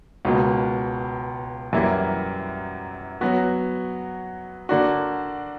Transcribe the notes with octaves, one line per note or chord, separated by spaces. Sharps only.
C#2 B2 A#3
F#2 E3 G3 A#3 E4
F#3 B3 F#4
D3 A#3 D4 F#4